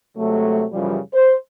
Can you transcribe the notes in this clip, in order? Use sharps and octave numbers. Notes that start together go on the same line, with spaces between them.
C3 F#3 G#3 A3
F#2 C#3 E3 F3 G3
C5